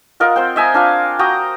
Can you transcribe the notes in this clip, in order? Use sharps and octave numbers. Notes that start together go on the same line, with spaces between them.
F4 A#4 D#5 F#5
C4 C5 G5
D#5 E5 G#5 A#5
D4 F4 F5
F#4 G5 A#5 D#6